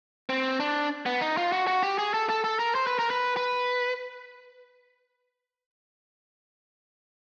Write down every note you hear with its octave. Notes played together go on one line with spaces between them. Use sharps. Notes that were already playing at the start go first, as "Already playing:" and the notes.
C4
D4
B3
D#4
F4
F#4
F#4
G4
G#4
A4
A4
A4
A#4
C5
B4
A#4
B4
B4